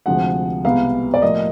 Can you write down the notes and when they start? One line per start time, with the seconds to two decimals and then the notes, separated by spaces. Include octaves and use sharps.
0.06 D2 C3 F3 G#3 F#5
0.64 C2 B2 G#3 B3 F5
1.14 D5
1.22 A2 F3 A#3 D#5